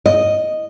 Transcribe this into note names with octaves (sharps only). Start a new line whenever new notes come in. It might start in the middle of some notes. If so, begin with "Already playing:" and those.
D#5